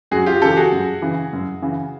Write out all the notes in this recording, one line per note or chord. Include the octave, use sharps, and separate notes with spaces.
F#2 F#4 G#4
F4 G4
C#3 E3 G4 A4
F#4 G#4
F#2
C#3 E3
F#2
C#3 E3